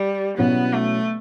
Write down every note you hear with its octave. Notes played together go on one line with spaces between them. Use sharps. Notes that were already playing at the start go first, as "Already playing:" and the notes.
Already playing: G3
B2 F#3 B3 C#4 E4
A3